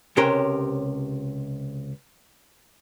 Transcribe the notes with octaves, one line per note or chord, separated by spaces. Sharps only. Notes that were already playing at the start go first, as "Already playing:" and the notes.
C#2 C3 C#4 G4 A#4 C5